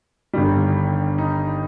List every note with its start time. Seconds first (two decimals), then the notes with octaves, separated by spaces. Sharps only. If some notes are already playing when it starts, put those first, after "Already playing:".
0.33 G1 G2 D#3 G3
1.18 D#4